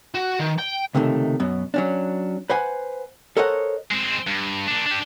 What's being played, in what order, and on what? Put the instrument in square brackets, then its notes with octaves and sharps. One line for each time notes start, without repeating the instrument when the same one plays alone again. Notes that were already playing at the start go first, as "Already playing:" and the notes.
[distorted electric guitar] F#4
D#3
G5
[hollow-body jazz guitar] C#2 C3 D#3 A3
F#2 B2
F#3 C#4 D4
B4 C5 F#5 G#5
A4 A#4 C5 C#5 D#5 F#5
[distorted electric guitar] G#3 C4
G2
A#2 D4
D4 G4